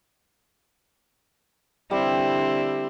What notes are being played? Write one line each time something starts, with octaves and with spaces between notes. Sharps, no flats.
D3 G3 C4 E4 C5